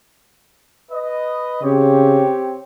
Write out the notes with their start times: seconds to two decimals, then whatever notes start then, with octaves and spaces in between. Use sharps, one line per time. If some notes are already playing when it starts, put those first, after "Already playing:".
0.92 B4 D#5
1.63 C#3 C4 G4 C#5